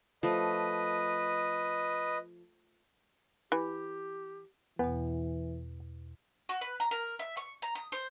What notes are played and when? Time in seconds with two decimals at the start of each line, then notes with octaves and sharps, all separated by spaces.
0.23 F3 A3 B4 D#5
3.52 E3 G4
4.79 E2 B2 E3 B3
6.49 F#4
6.61 B4
6.80 A#5
6.91 A#4
7.19 E5
7.37 C#6
7.62 A#5
7.75 D#6
7.92 C5